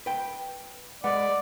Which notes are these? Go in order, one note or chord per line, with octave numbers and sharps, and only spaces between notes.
B4 G5
G#3 B4 D5 F#5